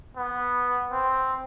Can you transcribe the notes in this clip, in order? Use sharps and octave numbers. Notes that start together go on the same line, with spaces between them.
B3
C4